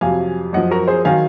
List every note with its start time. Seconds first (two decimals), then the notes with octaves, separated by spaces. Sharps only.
0.01 F2 C3 F#3 F5 G#5
0.53 F#2 F3 D#5 F#5
0.71 F#4 A#4
0.88 G#4 C5
1.05 D#3 F#3 F5 G#5